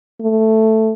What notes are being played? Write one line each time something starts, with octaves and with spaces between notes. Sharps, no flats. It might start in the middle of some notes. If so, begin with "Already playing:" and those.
A3